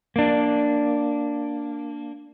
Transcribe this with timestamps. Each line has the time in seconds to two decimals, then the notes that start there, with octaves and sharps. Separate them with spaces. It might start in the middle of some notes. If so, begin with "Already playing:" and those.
0.16 A#3 D4